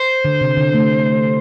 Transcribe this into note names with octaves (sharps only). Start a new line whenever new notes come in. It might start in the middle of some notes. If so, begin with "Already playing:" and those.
Already playing: C5
D3
C3
D3
A3